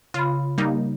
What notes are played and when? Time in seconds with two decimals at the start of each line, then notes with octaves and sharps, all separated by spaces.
0.14 C#3 F4 B5
0.58 G3 A#3 D#4